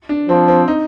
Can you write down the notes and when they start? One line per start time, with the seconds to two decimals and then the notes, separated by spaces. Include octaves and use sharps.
0.09 D4
0.29 F3 C4
0.48 C4
0.68 D#4